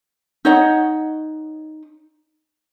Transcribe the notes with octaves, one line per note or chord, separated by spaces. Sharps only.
D#4 C#5 D#5 F#5